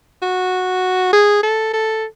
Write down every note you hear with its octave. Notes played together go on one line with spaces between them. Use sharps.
F#4
G#4
A4
A4